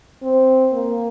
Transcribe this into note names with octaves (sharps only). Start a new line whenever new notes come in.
C4
A#3